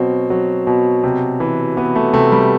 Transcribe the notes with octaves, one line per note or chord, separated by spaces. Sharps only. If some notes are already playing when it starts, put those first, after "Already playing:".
Already playing: B2 F#3 C4
F#3
B2
C3
E3
E3 B3
A3
C3 A3
G3